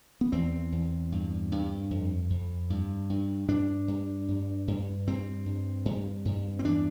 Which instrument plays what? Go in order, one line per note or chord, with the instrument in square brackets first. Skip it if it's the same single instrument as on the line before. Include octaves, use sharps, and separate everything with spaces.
[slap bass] B3
E2 C4
E2
G2
G2
F2
F2
G2
G2
G2 D4
G2
G2
G2
G2 C4
G2
G2
G2
C4
E2 D4